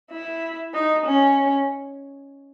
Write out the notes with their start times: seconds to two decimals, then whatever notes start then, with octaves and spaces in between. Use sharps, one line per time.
0.11 E4
0.74 D#4
1.06 C#4